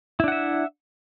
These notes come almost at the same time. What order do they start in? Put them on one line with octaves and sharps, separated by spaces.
E4 D4 F#5 E5